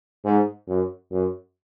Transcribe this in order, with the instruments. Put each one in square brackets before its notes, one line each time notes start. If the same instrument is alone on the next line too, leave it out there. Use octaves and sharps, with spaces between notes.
[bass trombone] G#2
F#2
F#2